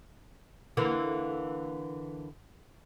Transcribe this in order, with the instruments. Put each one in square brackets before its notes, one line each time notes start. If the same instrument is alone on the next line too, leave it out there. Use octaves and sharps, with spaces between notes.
[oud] D3 E3 A#3